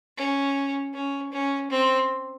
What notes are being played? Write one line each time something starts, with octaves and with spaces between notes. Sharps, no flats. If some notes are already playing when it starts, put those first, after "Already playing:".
C#4
C#4
C#4
C4